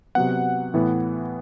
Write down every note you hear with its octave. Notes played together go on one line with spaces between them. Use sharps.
C3 F#3 B3 F#5
A2 E3 B3